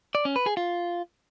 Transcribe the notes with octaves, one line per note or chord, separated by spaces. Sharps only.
D5
C#4
B4
G#4
F4